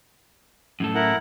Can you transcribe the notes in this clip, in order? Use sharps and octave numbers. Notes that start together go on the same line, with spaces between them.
F#2 A2 A4
E4 A#4 F#5